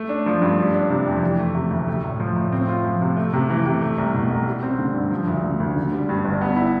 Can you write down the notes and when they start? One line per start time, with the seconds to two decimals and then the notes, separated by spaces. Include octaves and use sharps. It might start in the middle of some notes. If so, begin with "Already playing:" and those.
Already playing: A3
0.09 D4
0.26 F3
0.42 G2
0.58 G3
0.74 D4
0.90 C3
1.06 F2
1.23 E3
1.39 A3
1.55 C3
1.71 D2
1.88 A3
2.04 A2
2.20 F3
2.36 A2
2.52 C4
2.68 F4
2.84 F3
3.01 C3
3.17 A3
3.33 C3
3.50 E3
3.66 C3
3.81 A3
3.98 C2
4.14 B2
4.31 C2
4.46 G3
4.63 C4
4.79 D3
4.95 G2
5.11 F3
5.27 D2
5.44 D3
5.60 D2
5.76 D3
5.93 G3
6.09 G2
6.25 G1
6.41 B3
6.56 E4